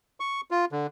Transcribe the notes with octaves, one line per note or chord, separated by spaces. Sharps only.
C#6
F4
D3